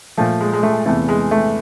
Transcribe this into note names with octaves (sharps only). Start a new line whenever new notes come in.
A#2 F3 A3
G#3
G#3
A3
E2 C3 E3 A3
G#3
A3